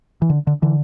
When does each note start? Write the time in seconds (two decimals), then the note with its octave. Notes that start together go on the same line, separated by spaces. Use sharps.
0.22 E3
0.30 D3
0.47 D3
0.62 D3 E3